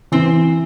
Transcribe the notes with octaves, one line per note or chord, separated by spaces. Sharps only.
E3 C4 C5